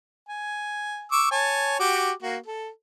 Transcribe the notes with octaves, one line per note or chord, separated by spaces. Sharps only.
G#5
C#6 D6 E6
C#5 G#5 A5
F#4 G4 D6
A#3 F#4
A4